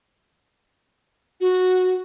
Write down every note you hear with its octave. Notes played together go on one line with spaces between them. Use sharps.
F#4